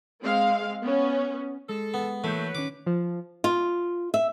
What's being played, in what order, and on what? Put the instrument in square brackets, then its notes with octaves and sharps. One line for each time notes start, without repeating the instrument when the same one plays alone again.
[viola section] G#3 C4 F5
B3 C#4
[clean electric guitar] G#3 [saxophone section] A4
[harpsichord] B3
[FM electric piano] E3 A#3 G6 [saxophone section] F#3 B4 [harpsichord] A3
[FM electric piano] D#3 C#4 [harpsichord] D6
[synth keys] F3
[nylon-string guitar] F4
E5